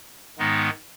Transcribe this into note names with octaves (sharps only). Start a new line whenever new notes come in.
G#2 D#3 G#3 B3 D#4